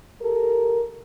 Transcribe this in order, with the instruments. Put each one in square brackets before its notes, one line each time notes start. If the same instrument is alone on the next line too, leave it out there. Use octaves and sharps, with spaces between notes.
[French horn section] G4 A4 A#4